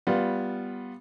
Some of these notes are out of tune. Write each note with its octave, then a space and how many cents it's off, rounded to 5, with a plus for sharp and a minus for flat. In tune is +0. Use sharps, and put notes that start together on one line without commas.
G3 +0 B3 -5 F4 +0